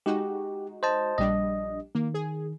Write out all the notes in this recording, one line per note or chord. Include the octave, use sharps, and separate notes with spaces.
G#3 D#4 F#4 G4
C5 D#5 A5
A#1 G3 D4 D#5
D#3 A#3
G#4